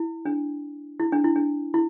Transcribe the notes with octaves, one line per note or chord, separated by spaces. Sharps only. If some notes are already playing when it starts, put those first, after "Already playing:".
Already playing: E4
D4
E4
D4
E4
D4
E4